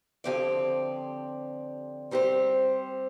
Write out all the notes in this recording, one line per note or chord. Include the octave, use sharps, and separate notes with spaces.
D3 F3 C4 G4 D5
G3 C4 G4 C5